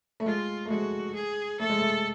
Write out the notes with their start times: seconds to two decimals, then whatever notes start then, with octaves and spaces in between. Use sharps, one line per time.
0.20 A3
0.26 G#3 F4
0.66 A3
0.70 G#3 F#4
1.15 G#4
1.60 A3 A4
1.70 G#3
1.80 A3